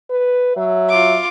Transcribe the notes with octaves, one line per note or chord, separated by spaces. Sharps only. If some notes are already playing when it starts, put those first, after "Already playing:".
B4
F#3 E5
F4 D6